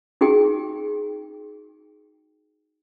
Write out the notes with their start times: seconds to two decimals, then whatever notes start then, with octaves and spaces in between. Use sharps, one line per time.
0.21 D#4 F#4 G#4 G5